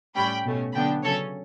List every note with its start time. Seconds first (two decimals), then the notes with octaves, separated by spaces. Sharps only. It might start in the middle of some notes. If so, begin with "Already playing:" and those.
0.15 A2 G3 C#4 G5 B5
0.45 B2 A3 C#4
0.73 D3 F#3 B3 D4 G5 B5
1.03 C#3 F#3 C#4 A4 C#5